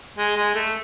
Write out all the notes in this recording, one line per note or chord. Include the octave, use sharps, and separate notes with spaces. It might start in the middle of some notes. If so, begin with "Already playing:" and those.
G#3
G#3
A3